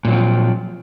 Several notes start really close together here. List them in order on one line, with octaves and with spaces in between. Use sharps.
A#2 F#3 C4 F3